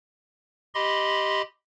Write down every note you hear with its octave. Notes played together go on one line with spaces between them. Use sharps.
G4 D#5 B5 C6